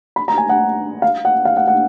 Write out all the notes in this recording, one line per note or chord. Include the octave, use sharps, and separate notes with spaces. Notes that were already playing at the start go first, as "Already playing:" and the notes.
B5
A#5
G#5
F#5
F5
F#5
F5
F#5
F#5